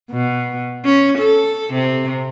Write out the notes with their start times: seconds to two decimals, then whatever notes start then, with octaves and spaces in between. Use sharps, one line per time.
0.11 B2
0.85 C#4
1.18 A4
1.74 C3